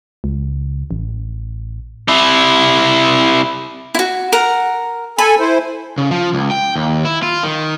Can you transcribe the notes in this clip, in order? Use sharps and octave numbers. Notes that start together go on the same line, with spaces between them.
C#2
A1
C3 E4
E4 F#4
A#4 F#5
A4 G#5 B5
E4 C5
C#3
F3
C#2
G5
D#2
E4
F4
D#3